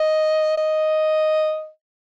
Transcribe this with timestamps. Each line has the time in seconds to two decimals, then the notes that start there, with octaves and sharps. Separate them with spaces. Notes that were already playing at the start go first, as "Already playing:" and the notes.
Already playing: D#5
0.58 D#5